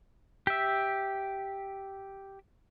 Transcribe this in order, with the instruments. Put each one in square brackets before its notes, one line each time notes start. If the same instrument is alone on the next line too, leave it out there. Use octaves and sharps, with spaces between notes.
[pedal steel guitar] G4 E5